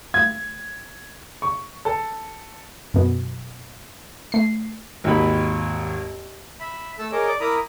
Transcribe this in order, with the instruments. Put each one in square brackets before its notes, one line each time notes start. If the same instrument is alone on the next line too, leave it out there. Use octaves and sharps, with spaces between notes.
[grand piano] G#6
[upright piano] C#6
A4
[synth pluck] F#2 B2
A3 C7
[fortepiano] G#1 D#2 B5
[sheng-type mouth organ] E5 B5
A3 A4 A5 E6
G#4 A#4 C#5 D#5 D6
D5 D6
E4 A#4 A#5 B5 D6 D#6